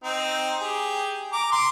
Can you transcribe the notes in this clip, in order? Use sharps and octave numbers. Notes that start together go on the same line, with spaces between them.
C4 D#4
G4 G#4
A#5 D6
C6 D6